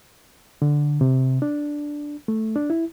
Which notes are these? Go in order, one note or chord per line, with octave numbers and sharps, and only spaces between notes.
D3
C3
D4
A3
D4
E4